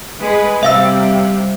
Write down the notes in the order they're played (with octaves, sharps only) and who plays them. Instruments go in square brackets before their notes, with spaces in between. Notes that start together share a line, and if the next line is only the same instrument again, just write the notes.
[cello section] G#3 G#4 B4
[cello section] C3 G3 C4 [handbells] E5 F5 E6